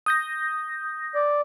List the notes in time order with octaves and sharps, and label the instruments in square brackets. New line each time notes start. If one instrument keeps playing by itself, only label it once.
[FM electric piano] D#6 G6 A#6
[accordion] D5